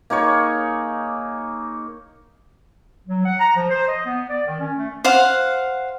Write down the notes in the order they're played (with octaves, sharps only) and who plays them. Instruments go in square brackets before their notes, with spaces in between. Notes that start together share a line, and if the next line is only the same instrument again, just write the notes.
[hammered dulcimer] A#3 D#4 G#4 C#5
[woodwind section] F#3
F#5
A#5
F3
C5
D#5
B3
D5
D#3
C#4
A3
[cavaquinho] C5 F5 F#5